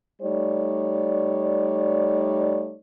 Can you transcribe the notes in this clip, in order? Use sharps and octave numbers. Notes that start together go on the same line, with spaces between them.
G3 A3 D#4 C#5 D5